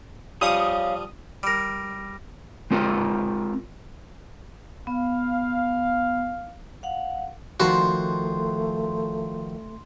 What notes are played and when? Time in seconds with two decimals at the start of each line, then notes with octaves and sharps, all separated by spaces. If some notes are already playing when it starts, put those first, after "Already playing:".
0.41 F3 G3 C#5 F5 D#6
1.43 G3 A#4
2.71 G#3 C4 F4 A#4
4.87 B3 F5
6.83 F5 F#5
7.60 D#3 F3 A3 F#4 A5 C6